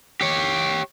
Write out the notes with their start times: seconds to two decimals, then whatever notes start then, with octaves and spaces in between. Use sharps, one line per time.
0.21 G4 C#5